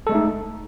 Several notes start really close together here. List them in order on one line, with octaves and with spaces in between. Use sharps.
A4 G#3 A3 D#4